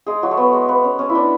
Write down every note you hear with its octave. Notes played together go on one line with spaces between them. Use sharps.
G#3 G#4
F#3 F#4
A3
B3
G#3
B3
C#4
C#4
E4
D4